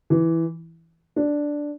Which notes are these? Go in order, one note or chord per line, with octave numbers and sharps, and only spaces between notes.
E3
D4